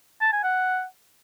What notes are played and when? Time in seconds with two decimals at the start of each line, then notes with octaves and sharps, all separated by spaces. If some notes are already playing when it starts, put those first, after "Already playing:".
0.21 A5
0.32 G#5
0.44 F#5